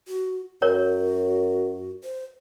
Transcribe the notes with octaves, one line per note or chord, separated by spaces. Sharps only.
F#4
F#2 F#4 A#4 C#5
C5